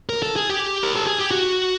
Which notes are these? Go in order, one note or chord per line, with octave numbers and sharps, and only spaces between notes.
A#4
A4
G#4
G4
A#4
A4
G#4
G4
F#4